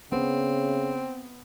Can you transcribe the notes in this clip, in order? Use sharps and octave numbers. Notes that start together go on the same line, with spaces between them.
C#3 B3 C4